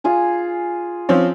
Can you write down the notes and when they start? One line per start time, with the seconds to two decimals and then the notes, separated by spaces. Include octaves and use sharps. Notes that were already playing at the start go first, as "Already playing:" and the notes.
0.04 F4 G#4 G#5
1.09 F3 C4 C#4